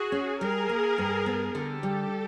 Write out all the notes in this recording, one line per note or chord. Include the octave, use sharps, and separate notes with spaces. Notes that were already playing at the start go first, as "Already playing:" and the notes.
Already playing: F#4 G#4
C#4
G3 G#4 A#4
A#3
G2
B3
D3 G4 A4
G3